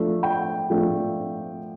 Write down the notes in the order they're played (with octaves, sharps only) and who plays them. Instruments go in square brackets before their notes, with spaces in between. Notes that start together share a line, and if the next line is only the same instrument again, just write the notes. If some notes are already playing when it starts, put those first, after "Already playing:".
Already playing: [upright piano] F3 A3 D4
G5
F3 A3 D4